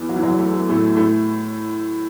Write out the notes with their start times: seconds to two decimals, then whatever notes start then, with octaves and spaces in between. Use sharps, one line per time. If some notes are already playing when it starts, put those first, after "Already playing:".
Already playing: E2 E3
0.09 F#3
0.16 E3
0.23 F#2 F#3
0.38 A3
0.53 A3
0.69 A2 A3
0.96 A2 A3